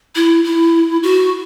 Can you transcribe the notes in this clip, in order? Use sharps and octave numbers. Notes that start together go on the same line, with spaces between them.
E4
E4
F#4